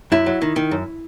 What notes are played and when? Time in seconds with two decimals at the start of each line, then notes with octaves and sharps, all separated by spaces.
0.12 F#2 E4
0.26 F#3
0.42 D#3
0.56 D#3
0.71 F#2